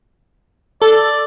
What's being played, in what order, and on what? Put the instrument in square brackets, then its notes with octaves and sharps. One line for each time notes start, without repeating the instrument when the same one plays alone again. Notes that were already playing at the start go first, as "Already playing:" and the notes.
[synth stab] A4 [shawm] D5